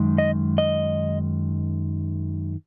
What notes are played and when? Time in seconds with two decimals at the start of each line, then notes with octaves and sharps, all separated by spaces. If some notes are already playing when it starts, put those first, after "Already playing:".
Already playing: F#2 D#3 G#3
0.18 D#5
0.58 D#5